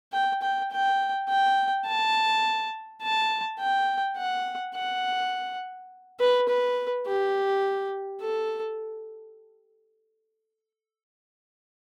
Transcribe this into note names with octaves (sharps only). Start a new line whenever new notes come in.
G5
G5
G5
G5
A5
A5
G5
F#5
F#5
B4
B4
G4
A4